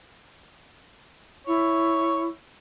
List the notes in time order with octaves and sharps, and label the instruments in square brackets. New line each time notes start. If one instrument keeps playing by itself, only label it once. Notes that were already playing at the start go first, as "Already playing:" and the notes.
[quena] E4 [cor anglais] C#5